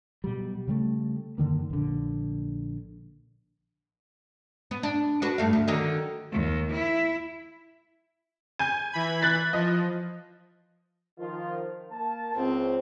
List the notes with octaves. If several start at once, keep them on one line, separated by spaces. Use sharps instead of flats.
B2 F#3 G3
C#3 G3 A3
F#2 D3 D#3 A#3
A#1 D3
B3
D4
D4 F#4 B4
G2 A3 F5
D2
D3 D#3 F#3
D#2
E4
G#5 G6
E3 B5 G#6
F#6 A6 B6
F3 D#5
D#3 F3 F4
A#3 A5
C#2 C4